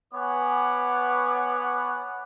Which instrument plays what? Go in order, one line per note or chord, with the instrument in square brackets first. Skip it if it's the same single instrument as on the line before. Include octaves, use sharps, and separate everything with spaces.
[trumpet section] B3 B4 C#5 F#5 G#5 D6